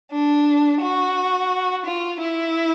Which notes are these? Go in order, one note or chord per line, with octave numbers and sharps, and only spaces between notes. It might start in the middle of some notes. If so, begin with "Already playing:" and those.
D4
F#4
F4
E4